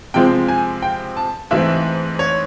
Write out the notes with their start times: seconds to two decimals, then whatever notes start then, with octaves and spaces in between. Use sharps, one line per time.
0.14 C3 F3 G#3 C4 G5
0.48 G#5
0.82 G5
1.17 A5
1.51 G#2 E3 A3 C4 E5
2.19 C#5